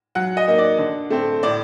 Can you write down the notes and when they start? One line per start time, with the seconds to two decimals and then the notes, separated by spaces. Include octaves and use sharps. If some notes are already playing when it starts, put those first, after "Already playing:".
0.15 F#3 F#5
0.37 D#5
0.48 A#3 D#4
0.58 D5
0.78 D3
1.10 A3 C4
1.43 A2 D5